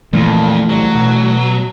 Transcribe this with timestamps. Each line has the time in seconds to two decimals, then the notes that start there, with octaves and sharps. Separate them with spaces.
0.13 F2 A#2 E3 A3
0.69 C2 F#3
0.95 B2